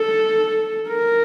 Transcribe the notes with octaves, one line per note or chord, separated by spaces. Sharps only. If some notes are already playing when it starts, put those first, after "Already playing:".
Already playing: A4
A#4